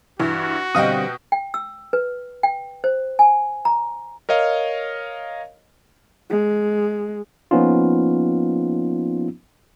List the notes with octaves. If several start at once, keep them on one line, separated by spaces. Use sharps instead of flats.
G2 E3 F#4
B2 D3 G3 C4 D#5 F5 G5 D#6
G5
E6
B4
G5
C5
G#5
A#5
A#4 C#5 D#5 F5
G#3
F3 A#3 B3 C#4 D#4 F4